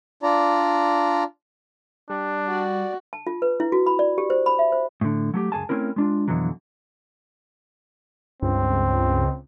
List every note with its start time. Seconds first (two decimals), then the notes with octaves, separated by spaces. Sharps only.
0.23 D4 F4 D5 A#5
2.10 G3 D4
2.48 F#4 D5
3.13 A5
3.27 F4
3.42 B4
3.60 E4
3.72 F#4
3.86 B5
3.99 D5
4.18 G4
4.30 C5
4.46 B5
4.59 E5
4.72 C5
5.01 A2 D3
5.34 F#3 A3 G4
5.52 C#2 F#2 G#4 G#5 A5
5.69 A3 C4 C#4 E4 A#4
5.96 G#3 D4 F4
6.28 F2 B2 D3 E3 F#3
8.43 C#2 G2 C4